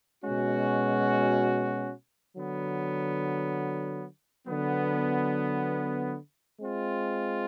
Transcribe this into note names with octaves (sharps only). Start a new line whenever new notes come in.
B2 G#3 C#4 F#4
D3 F#3 B3
D3 F#3 B3
G#3 C4 F4